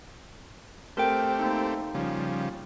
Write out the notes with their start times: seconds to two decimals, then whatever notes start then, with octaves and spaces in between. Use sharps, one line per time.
0.97 A3 C4 G4 A#4 G5
1.39 A#3 D#4
1.95 C#3 F3 G3